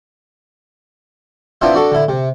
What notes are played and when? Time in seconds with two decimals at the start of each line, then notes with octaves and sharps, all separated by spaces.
1.61 B3 C4 D4 E4 F4 E5
1.74 D4 F#4 A4
1.92 D3 E4
2.08 C3